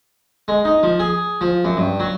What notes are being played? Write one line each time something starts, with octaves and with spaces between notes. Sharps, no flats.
G#3
D#4
F3
G#4
F3
F#2
G2
F#3